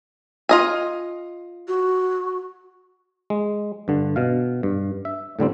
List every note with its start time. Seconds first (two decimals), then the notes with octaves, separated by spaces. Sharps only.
0.49 F4 D#5 G#5
1.68 F#4
3.30 G#3
3.88 G2 D3
4.16 B2 F5
4.63 G2
5.05 E5
5.39 A2 D3 G3 C4